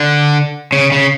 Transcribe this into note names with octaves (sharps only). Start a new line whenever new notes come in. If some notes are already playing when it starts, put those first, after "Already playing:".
Already playing: D3
C#3
C#3